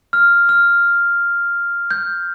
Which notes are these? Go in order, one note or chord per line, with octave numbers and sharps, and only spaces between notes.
F6
F6
G6